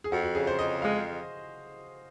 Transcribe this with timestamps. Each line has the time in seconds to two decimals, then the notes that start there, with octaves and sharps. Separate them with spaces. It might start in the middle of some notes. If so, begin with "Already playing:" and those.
0.04 G#4
0.11 F2 F#4
0.23 F#4
0.35 C#3 G#4
0.47 C5
0.58 F2 D#5
0.82 G#3 F5